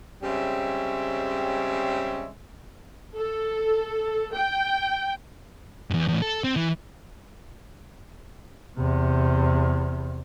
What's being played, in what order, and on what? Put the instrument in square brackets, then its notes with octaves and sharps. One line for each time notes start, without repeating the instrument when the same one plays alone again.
[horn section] C#3 G3 G#3 C4 C#5 E5
[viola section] A4
G5
[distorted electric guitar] E2 G2
E2 A2
A4
C4
E3
[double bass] E2 C3